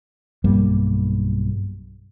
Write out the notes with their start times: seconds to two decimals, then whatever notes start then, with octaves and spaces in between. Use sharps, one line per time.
0.44 B1 G2 G3 A#3